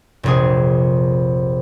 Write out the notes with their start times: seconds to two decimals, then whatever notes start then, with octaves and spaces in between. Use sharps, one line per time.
0.23 F1 A#1 G#4